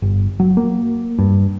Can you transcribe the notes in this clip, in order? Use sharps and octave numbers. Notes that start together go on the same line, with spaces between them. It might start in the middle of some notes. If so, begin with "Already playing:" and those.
G1
F#3
A#3
G2